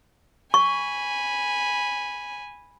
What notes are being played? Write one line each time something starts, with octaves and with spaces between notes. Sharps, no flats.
G#5 B5 C#6